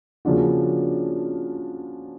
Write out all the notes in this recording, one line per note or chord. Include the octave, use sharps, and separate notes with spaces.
C#3 F3 A#3 D4 F#4